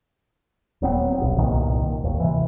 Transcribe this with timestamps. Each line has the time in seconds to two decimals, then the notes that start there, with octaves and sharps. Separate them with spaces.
0.82 D#1 F#3 B3 C4
1.20 D#1 B1
1.38 G1 C2 A#2 D#3
2.04 G#1 D#2
2.20 C3 E3